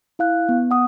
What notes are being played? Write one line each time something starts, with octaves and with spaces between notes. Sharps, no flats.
E4 F5 F#6
B3
F#5 D#6